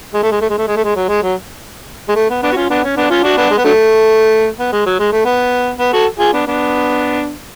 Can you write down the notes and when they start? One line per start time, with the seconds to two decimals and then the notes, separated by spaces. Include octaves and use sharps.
0.14 G#3
0.23 A3
0.31 G#3
0.41 A3
0.49 G#3
0.58 A3
0.67 G#3
0.76 A3
0.84 G#3
0.96 F#3
1.08 G#3
1.22 F#3
2.09 G#3
2.16 A3
2.30 B3
2.43 B3 D4
2.52 F#4
2.56 C#4 F4
2.70 B3 D4
2.84 C#4
2.96 B3 D4
3.10 C#4 F4
3.23 D4 F#4
3.37 B3 D4
3.50 G#3
3.58 B3
3.65 D3 F#3 A3
4.58 B3
4.72 G#3
4.86 F#3
4.99 G#3
5.12 A3
5.25 B3
5.79 B3
5.93 F#4 A4
6.19 F4 G#4
6.33 B3 D4
6.47 B3 D4